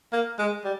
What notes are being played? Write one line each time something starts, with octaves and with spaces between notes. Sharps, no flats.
A#3
G#3
G3